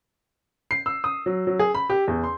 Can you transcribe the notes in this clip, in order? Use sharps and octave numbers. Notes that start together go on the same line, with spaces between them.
C7
E6
D#6
F#3
F#3
G#4
B5
G4
E2
C6